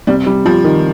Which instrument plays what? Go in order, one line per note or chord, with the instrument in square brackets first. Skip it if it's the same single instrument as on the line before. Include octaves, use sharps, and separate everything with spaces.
[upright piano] C3 [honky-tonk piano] G3
[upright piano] G3
[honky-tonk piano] F3 [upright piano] G3
[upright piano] D#3